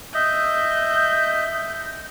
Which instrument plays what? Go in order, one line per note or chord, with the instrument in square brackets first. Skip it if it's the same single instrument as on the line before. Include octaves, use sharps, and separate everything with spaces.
[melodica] D#5 E5 [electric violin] G6